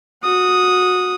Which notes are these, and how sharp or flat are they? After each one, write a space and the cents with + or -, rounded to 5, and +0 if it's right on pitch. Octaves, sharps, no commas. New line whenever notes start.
F#4 -20 D#6 +0